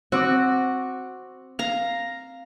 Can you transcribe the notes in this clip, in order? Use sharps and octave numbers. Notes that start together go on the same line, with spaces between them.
C4 F#4 D6 F#6
F5 A#5